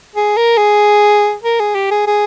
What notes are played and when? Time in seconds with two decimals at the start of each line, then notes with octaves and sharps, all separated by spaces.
0.15 G#4
0.37 A#4
0.58 G#4
1.43 A#4
1.60 G#4
1.75 G4
1.91 G#4
2.07 G#4